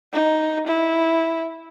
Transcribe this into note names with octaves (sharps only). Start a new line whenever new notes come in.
D#4
E4